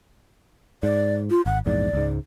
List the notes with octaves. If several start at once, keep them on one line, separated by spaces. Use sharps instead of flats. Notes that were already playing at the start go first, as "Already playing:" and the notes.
G#2 D5
F4
G#1 F#5
A#1 E2 G#2 D5
C#2 G#2